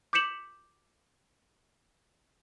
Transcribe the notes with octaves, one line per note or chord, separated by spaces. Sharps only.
D6 G6 B6 C#7 E7 F#7